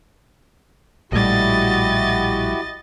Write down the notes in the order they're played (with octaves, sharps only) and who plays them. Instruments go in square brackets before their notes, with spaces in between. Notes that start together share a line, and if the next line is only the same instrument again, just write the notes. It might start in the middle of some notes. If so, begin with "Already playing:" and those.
[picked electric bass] A#1 A2 G3 [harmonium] E4 F#4 G4 [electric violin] D#5 A6